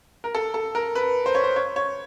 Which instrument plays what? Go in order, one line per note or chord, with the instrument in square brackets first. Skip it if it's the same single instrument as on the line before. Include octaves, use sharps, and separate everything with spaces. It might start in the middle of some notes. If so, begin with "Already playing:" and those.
[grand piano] A#4
A4
A4
A#4
B4
C5
C#5
C5
C#5
C#5